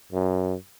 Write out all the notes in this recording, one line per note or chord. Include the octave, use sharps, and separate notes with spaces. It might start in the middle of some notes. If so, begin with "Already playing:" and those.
F#2